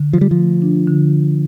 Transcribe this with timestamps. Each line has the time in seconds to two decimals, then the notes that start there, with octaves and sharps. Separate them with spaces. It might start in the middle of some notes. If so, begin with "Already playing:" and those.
Already playing: D3
0.13 F3 F4
0.21 G3
0.31 F3
0.37 A3
0.62 D4
0.88 D3